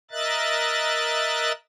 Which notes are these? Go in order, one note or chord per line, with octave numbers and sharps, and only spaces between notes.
A#4 D#5 E5 F#6 A6